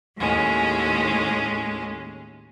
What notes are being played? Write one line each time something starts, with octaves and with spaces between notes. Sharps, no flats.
D#2 A2 G#3 C#4